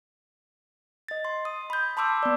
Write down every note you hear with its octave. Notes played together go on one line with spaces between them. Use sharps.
D#5 A6
C6
D#6
B5 G6
A5 B5 C6 D6 E6 G6
B3 D5